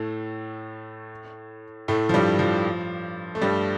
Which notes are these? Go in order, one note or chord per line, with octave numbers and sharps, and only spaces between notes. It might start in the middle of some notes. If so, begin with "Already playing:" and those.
Already playing: A2 A3
A2 A3
F3
G2 G3
F3
A3
G2 G3